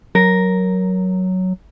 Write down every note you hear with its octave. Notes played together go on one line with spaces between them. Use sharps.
F#3 A#4